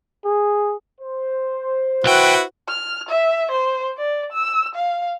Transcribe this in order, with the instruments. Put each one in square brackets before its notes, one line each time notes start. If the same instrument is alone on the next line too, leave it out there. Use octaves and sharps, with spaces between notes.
[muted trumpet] G#4
[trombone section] C5
[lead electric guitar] B1 G5 [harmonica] E4 F#4 B4
[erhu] F6
E5
C5
D5
E6
F5